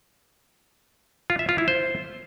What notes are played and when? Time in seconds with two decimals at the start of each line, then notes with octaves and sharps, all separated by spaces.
1.30 F4
1.39 E5
1.49 F4
1.58 E4
1.68 C5